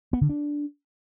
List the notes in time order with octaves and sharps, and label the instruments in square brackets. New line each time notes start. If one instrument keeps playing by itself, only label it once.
[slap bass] B3
D3
D4